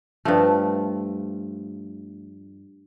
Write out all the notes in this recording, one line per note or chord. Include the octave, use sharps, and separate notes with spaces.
G2 F3 A3